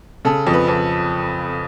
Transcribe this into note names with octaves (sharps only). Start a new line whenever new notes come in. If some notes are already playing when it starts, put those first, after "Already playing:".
C#3 A4
F2
B4
F2